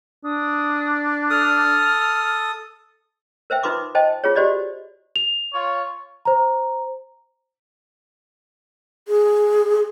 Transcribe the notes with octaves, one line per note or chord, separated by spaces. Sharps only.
D4 D#6
A4 D#6 F6
A#4 C5 E5 G5
D#4 F4 B4 C6 D6 D#6
C5 D#5 G5 A5
F4 G#4 C#5
F#4 G4 C5 D5 D#5
F7
F4 C#5
C5 A#5
G#4